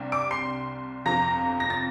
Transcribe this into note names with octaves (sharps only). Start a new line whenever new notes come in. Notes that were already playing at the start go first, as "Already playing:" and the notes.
Already playing: C2 C3 G3 D4
D6 D7
C6 C7
G1 F2 C3 F3 A#5 A#6
A#6
A6